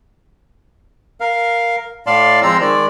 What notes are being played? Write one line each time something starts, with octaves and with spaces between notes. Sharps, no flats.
A#4 F5
A2 D5 F5 A5 C6
F3 G#3 C4 A#5 C6 E6
D#3 G#3 D5